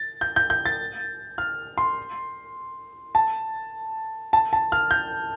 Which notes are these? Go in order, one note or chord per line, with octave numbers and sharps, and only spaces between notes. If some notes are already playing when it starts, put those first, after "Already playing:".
Already playing: A6
G6
G6
G6
A6
F6
C6
A5
A5
A5
F6
G6